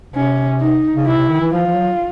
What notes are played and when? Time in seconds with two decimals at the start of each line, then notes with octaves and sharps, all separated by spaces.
0.14 C3 C#4
0.61 D#4
0.96 C#3
1.07 C3 E4
1.18 C3
1.29 D#3
1.41 E3
1.52 F3 F4
1.66 F3
1.74 F#3